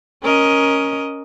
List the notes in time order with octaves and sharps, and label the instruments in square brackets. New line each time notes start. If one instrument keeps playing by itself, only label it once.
[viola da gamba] C#4 A#4 D#5